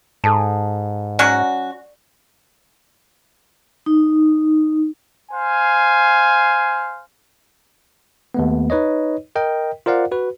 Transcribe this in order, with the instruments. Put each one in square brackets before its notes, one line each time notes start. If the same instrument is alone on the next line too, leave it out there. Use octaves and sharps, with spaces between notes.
[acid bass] G#2 [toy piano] A4 A5
[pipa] F#3 C#4 F#4 [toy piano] D5
[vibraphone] D#4
[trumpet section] C5 F5 G#5
[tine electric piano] D#2 A3 B3
D#4 B4 C#5 D#5
A#4 D#5 G5
F4 A#4 C5 D5 F5 F#5
F#4 B4